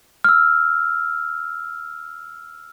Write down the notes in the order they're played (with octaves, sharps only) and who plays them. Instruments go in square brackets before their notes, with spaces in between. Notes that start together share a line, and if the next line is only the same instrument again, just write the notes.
[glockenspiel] E6 F6